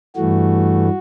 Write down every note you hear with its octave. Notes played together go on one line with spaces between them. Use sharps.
G2 E3 A3 F#4